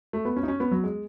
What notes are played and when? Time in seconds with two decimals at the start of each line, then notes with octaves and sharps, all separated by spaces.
0.13 A3
0.25 B3
0.36 C#4
0.43 D#4
0.48 C#4
0.60 B3
0.71 F#3
0.84 G#3